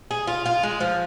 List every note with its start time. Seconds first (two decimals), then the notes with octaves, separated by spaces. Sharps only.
0.11 G#4
0.27 F4
0.46 F4
0.63 G#3
0.80 F3